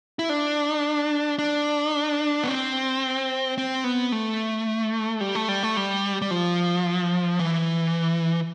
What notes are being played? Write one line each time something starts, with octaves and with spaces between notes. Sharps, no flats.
E4
D4
D4
B3
C4
C4
B3
A3
G3
A3
G3
A3
G3
G3
F3
E3